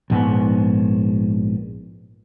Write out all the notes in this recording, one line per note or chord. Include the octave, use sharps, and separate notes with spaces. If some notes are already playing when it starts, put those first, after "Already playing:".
A#1 G#2 B3